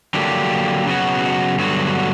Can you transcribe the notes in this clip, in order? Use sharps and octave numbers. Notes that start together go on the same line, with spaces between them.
D3 F#3 A#3 D4 G4
C#3 F#3 B3 F#4
G2 D3 F#3 B3 F#4